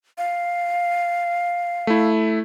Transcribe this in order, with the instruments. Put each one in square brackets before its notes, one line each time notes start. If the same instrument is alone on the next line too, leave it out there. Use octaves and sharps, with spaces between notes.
[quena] F5
[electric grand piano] A3 E4